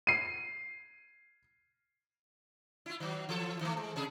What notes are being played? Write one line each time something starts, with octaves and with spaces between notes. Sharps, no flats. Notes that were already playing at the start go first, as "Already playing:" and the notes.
C7 D#7
E4 F4
D#3 F#3
E3 A4
D#3 A3
G#3
C3 G#4 A4